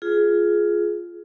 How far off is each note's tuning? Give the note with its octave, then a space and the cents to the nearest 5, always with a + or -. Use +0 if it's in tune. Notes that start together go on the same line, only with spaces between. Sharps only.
F4 +0 G#4 +15